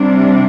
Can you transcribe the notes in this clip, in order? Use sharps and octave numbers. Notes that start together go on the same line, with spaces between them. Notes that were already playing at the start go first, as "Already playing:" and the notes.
Already playing: C3 G3 D4